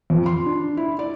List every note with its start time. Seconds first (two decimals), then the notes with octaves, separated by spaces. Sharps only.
0.10 F2
0.26 C6
0.46 D4
0.77 E4
0.99 D5